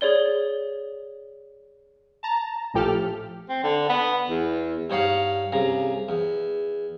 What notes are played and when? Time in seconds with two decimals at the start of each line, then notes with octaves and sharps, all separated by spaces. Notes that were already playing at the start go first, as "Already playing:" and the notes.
0.01 G#4 C#5 D5 G7
2.23 A5 A#5
2.74 A#1 A2 F3 G4 A4 F6
3.49 C4
3.64 D3
3.89 B3
4.29 E2
4.90 G2 D#4 C#5 F5 F#5
5.52 C2 C#3 A#5
6.09 E2